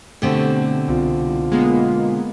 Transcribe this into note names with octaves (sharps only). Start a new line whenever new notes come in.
B2 D3 A3 C4 G4
C2 F4
G#3 A#3 B3